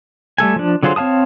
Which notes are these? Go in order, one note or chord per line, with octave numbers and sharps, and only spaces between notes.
G3 A3 A4 G#5
F3 D4
D3 F#3 F4 G#4 C5
C4 C#5 F5 A5 D#6